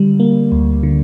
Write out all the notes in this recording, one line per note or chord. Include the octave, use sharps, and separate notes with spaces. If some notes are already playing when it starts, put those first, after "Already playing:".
Already playing: D3 G3
A#3
D2
D3